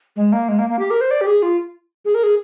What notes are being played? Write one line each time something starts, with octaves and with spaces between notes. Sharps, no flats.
G#3
A#3
G#3
A#3
A#3
G4
A#4
C5
D5
G4
G#4
F4
G#4
A#4
G#4